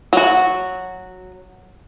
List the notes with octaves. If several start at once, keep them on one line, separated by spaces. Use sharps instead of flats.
F#3 F#4